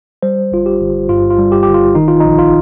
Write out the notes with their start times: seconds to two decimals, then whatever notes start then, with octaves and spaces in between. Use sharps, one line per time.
0.23 G3 C5
0.52 G1 F4
0.66 G4
0.80 G1
1.09 G2 F4
1.30 F4
1.38 G3
1.52 G4
1.63 G1 G4
1.74 F4
1.95 D#3 D#4
2.08 F4
2.20 D#4
2.24 A#1
2.39 F4